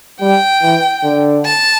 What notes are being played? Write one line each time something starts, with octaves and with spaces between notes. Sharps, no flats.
G3 G5
E3
D3
A5